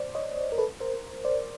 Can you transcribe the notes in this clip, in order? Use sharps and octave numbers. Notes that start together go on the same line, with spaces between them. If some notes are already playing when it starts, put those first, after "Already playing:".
Already playing: C5 D5
C#5 D#5
A#4
A4 B4
A#4 C5
C5 D5